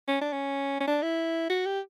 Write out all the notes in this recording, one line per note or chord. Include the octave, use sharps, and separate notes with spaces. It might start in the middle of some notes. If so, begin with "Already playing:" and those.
C#4
D4
C#4
C#4
D4
E4
F#4
G4